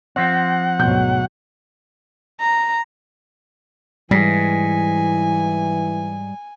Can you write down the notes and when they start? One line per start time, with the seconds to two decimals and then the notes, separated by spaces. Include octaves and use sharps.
0.16 F3 C4 F#5
0.79 D2 G#2 B2 F#3 G6
2.41 A#5
4.11 G#2 E3 G3 G#5